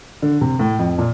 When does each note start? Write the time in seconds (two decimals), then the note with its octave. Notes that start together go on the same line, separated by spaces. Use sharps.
0.22 D3
0.41 C3
0.59 A2
0.79 F2
0.98 A#2